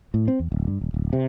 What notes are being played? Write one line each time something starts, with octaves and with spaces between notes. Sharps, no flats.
A2
C4
E2
D1
G2
D#1
D1
C3